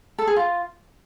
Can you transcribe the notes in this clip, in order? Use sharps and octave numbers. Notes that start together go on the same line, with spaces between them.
A4
G#4
F4